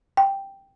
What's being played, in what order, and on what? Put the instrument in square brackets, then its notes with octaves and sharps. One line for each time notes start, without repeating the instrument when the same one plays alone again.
[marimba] G5